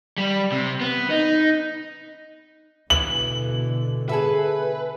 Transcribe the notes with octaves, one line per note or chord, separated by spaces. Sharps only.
G3
C3
B3
D#4
B2 D3 E3 F#7
G#4 A4 B4 E5